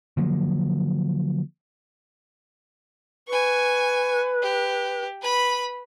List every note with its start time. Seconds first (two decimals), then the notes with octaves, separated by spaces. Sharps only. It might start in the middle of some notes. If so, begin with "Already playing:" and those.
0.17 D3 F3 F#3 A#3
3.28 B4 G#5 C#6
4.42 G4
5.22 B4 B5